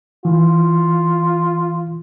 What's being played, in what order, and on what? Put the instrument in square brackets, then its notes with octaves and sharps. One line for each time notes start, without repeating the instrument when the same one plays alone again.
[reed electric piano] E3 [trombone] F4